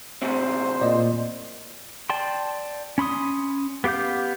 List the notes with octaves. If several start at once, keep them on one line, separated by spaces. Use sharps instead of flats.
A2 C#3 C4 C5
A#2 D5 D#5
D5 G5 A5 C6
C#4 B5 C6 D#6
B3 G4 F5 D6 G6